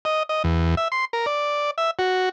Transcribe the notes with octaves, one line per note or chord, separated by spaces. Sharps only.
D#5
D#5
E2
E5
C6
A#4
D5
E5
F#4